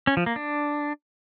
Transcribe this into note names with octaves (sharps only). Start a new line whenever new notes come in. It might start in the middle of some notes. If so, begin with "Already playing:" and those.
C#4
F3
A#3
D4